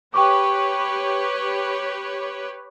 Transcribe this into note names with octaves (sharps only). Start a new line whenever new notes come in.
G4 B4 C#5 G5 C#6 D6